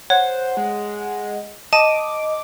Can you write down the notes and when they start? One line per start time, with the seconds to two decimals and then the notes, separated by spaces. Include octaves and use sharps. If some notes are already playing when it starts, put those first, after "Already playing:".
0.10 C5 C#5 F#5
0.57 G#3
1.73 D#5 A5 D6 D#7